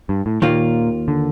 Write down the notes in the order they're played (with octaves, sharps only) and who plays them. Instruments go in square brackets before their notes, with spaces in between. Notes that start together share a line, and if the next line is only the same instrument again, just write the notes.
[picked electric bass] G2
A2
[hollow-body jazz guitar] D#2 D#3 A#3 F4 [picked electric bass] A#2
[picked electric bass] D3